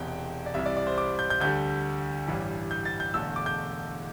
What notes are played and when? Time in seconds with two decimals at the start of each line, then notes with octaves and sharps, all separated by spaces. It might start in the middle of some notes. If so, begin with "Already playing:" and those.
Already playing: E1 E2 C3 G5
0.46 D5
0.54 C2 C3 E3 G3 E5
0.66 D5
0.77 D5
0.87 C5
0.98 D6
1.19 G6
1.30 G6
1.40 D2 D3 G3 G6
2.28 A1 G2 E3 G3
2.71 G6
2.85 A6
3.00 G6
3.14 E1 E2 D3 A3 E6
3.36 D6
3.46 G6